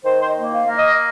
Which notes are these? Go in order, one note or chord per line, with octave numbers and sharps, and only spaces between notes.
D#3 C5
C5
D#5
A#3
F5
A#3
D#5